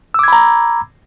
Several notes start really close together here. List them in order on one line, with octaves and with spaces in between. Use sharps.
E6 D6 G#6 B5 A#5